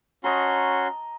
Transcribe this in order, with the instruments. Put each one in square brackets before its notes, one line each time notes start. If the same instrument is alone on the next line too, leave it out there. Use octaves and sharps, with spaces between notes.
[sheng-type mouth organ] C#4 F#4 C6 [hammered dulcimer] D#5 A5 A#5